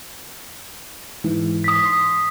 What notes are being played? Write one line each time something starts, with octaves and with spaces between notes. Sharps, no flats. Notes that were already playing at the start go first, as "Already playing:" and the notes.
G#2 E3
D#6 B6
C6